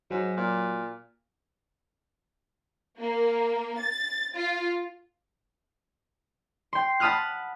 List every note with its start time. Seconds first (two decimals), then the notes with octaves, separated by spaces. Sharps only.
0.11 G#2 F#3
0.37 A#2
2.99 A#3
3.79 A6
4.36 F4
6.73 G5 C6
7.00 F#5 A5 B5 D#6 F6 F#6